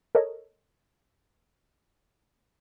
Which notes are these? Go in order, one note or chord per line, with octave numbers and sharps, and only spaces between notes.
A4 A#4 C#5 D#5